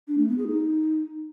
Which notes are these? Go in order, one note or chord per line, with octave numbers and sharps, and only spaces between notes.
D4
A3
B3
G#4
D#4